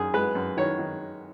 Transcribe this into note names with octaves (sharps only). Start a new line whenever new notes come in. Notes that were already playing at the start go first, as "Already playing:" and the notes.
Already playing: F#2 D#3 G#4
G#3 B4
F#2
D#3 C#5
D#3